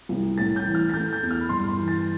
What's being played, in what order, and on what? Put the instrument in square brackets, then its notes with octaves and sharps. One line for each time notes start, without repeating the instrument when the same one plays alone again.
[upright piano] C2
A2 A6
G6
E3
F6
A6
A3 G6
G6
E2
F6
B5
G2 C6
C6
E3
A6